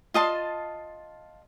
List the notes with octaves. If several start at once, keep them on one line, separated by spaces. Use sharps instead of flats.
F4 D#5 A5 C6